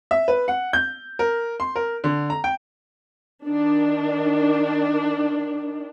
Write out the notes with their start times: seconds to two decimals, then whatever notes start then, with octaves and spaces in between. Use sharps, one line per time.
0.11 E5
0.28 B4
0.48 F#5
0.73 G6
1.19 A#4
1.60 C6
1.76 A#4
2.04 D3
2.30 A#5
2.44 G5
3.46 D#3 D4